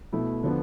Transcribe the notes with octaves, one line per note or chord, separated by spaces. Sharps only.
B2 A3 E4
D3 F3 B3